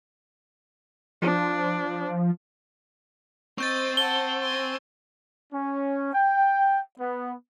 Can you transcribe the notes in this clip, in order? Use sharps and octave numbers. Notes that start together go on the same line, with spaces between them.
F3 D4
C4 C5 D#5 C#6 G6 A6
F#5 A5 G7
G#5 C6
C#4
G5
B3